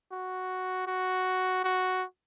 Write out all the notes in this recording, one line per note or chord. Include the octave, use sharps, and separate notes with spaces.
F#4
F#4
F#4